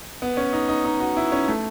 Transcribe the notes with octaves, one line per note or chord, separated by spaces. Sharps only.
B3
C#4
D#4
D#4
D#4
F#4
E4
C#4
A3